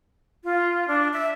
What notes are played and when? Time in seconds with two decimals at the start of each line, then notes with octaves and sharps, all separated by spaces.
0.44 F4
0.88 D4
1.13 E5